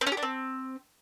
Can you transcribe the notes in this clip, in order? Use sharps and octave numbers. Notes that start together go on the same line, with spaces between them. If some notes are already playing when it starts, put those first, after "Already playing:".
C4
C#4
G4
D4
C4